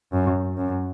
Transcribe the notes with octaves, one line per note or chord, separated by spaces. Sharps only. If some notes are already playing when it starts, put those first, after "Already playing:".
F#2
F#2